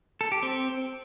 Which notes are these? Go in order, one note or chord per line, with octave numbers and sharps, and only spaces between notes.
A4
G4
C4